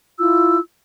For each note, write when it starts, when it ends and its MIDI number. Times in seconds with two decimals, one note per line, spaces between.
0.18 0.57 64
0.18 0.57 65
0.18 0.57 88